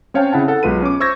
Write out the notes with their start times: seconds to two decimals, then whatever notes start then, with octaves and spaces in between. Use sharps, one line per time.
0.14 C4 C#4 C#5 F5 G5 A5
0.33 C#3 E4 F#5 A5
0.48 A4 F#5
0.63 B1 G#3 F4 B4 D#7
0.82 C#4 D6
1.00 C5 C#6 E6 G6 G#6 A#6